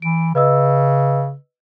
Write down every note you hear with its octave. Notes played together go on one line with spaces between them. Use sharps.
E3 D7
C#3 B4 D#5 E6